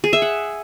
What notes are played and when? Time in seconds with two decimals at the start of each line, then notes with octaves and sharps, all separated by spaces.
0.04 G#4
0.13 E5
0.22 F#5